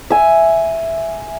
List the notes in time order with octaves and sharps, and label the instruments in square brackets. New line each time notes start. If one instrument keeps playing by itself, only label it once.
[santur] E5 G#5